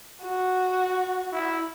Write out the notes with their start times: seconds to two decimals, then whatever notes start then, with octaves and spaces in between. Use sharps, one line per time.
0.22 F#4
1.32 E4